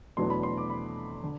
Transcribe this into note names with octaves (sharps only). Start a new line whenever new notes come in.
E2 B2 F#3 A3 D4 C6
B5
C6
D6
B5
D3